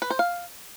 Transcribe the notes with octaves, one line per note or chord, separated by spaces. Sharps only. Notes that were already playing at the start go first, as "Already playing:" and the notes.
B4
C5
F5